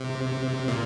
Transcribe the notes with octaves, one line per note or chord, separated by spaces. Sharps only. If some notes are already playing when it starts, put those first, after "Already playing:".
Already playing: C3
A#2